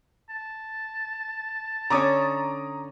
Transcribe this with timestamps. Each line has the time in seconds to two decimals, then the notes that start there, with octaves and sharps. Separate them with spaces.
0.30 A5
1.90 D3 C#4 C#5 A#5 D6 D#6